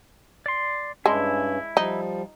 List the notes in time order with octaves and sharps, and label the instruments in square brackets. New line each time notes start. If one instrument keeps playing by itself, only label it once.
[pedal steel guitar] D5 C6
[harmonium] G2 C#4 [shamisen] G#3 D4 [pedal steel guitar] E4
[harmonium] F3 G3 [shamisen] D#4